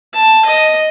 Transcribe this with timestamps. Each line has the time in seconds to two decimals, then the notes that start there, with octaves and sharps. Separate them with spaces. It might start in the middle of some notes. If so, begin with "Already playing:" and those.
0.12 A5
0.45 D#5